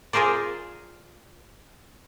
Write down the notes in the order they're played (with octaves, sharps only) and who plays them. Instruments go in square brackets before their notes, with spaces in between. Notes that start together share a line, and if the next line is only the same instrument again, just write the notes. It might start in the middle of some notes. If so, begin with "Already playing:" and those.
[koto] F4 G#4 A#4 C5 D5